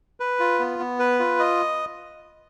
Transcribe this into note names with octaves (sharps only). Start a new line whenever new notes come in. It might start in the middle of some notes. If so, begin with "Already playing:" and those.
B4
F4
B3
B3
B4
F4
D#5